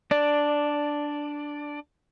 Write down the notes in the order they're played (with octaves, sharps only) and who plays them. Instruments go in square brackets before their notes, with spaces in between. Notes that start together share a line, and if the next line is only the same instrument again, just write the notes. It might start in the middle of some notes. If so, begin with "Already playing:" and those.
[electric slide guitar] D4 D5